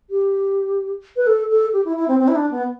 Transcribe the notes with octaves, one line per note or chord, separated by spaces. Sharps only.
G4
B4
A4
A4
G4
E4
E4
C4
C4
E4
D4
B3